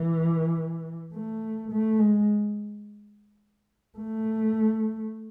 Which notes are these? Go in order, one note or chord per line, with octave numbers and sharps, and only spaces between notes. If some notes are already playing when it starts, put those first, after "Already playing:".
Already playing: E3
A3
A3
G#3
A3